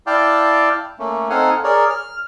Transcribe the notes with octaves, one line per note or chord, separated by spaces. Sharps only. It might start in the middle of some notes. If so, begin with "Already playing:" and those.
E4 D5 F5 G5 A5 D6
A3 A#3 C#4
C4 D#4 A4 F5 F#5 G#5
G#4 A#4 C#5 D5
F6